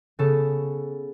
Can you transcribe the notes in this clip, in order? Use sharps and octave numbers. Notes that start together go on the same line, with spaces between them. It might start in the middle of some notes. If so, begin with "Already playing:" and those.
C#3 B3 A4